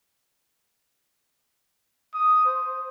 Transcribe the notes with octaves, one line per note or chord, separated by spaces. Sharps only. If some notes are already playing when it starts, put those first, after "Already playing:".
D#6
C5